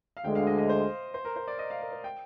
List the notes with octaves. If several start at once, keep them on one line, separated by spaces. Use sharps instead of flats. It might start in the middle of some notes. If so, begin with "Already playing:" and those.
F5
D2 D3 G#3 G5
F5
D#5
D#5
C5
C5
A#4
C5
D5
D#5
F5
A#4
C5
G5